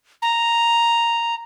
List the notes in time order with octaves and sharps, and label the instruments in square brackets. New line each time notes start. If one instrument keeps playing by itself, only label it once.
[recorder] A#5